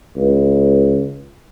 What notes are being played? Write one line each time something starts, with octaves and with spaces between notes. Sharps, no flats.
C#2